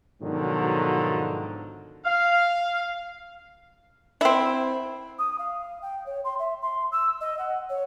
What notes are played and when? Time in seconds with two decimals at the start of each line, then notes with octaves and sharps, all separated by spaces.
0.21 G#2 B2 D3 D#3 F3 F#3
2.05 F5
4.21 C4 E4
5.19 D#6
5.39 F5
5.82 G5
6.06 C#5
6.25 C6
6.39 E5
6.62 C6
6.92 E6
7.21 D#5
7.39 F#5
7.70 C#5